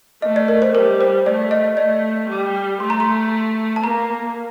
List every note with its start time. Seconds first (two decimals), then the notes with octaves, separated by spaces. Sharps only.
0.22 A3 D#5
0.36 D5
0.48 A#4
0.62 C5
0.75 G3 A#4
1.01 C5
1.26 A3 D5
1.51 D#5
1.77 A3 D5
2.29 G3
2.80 A3 C6
2.90 A#5
3.00 C6
3.76 A5
3.84 A#3 A#5